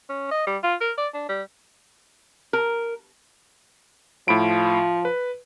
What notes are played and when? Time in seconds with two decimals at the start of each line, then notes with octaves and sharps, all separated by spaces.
0.09 C#4
0.31 D#5
0.47 G3
0.63 F4
0.81 A#4
0.98 D5
1.14 D4
1.29 G3
2.53 A#4
4.28 A2 F3 B5 D7
5.05 B4